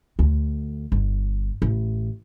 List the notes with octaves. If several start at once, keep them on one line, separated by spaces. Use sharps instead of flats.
D2
G1
A1